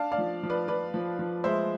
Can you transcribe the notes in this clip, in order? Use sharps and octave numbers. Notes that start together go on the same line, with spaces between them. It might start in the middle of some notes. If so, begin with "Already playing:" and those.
Already playing: D4 F5 A5
D5 F5
F3
F3
B4 D5
F3 B4 D5
F3
F3
G#3 C5 E5